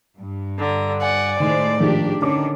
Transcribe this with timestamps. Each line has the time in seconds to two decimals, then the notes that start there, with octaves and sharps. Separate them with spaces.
0.17 G2
0.59 D3 A#5
1.00 D5 F#5 G#5
1.40 A2 D#3 G#3 C5
1.80 G#2 D#3 F3 D4 G4
2.21 D3 D#3 C#4 D4 D6